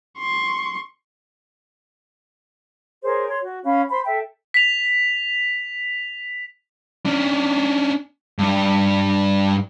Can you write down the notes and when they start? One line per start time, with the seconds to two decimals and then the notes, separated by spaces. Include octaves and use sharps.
0.19 C6 C#6
3.03 G#4 A#4 C5 C#5
3.28 C#5 C6
3.42 F#4
3.65 C#4 C#5 F5 B5
3.91 C5 B5 C6
4.06 A4 E5 G5
4.54 B6 F7
7.05 C#4 D4
8.38 G2 D4